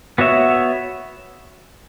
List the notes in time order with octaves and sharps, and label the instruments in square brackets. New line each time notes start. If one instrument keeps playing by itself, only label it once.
[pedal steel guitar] B3 F#4 C#5 E5